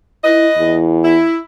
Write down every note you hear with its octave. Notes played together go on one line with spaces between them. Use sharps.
E4 B4 D#5
E2
E4